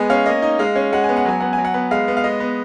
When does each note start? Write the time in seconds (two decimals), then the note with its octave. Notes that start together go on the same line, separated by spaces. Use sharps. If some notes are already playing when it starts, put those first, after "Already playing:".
Already playing: G#3 B3 G#5
0.10 C#4 F5
0.26 A#3 D#5
0.42 D#4
0.59 G#3 F5
0.76 C#4
0.93 G#3 F#5
1.04 B3 G#5
1.17 F#5
1.25 F#3 G#5
1.40 B3 F#5
1.53 G#5
1.58 F#3
1.65 F#5
1.74 B3
1.91 G#3 F5
2.08 B3
2.17 F5
2.24 G#3 D#5
2.40 B3